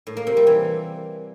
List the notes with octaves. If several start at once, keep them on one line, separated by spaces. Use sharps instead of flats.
A2
A#3
C3
G3
E3